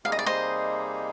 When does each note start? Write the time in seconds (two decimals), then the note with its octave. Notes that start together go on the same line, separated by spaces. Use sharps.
0.04 C3 G3 A#3 D#4 G#4 F5
0.12 D#5
0.19 D5
0.26 C5 D#5